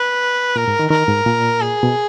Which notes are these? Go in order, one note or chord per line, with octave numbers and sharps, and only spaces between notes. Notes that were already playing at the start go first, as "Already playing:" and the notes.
Already playing: B4
A#2 A#4
G#2
D#3
D#3 A#4
G#2
A#2
G#4
B2